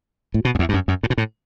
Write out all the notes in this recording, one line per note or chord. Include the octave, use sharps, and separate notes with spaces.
A2
B2
F#2
E2
G2
F#2
F#2
A2
B2
A2